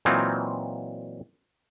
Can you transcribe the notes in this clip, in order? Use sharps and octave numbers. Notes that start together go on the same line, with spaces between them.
A#2 E3 F#3 C4 D#4 F4